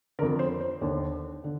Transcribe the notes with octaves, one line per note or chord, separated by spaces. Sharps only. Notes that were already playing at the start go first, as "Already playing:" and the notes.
F2 D3 A#4
C5
C5
D#2 D3
D3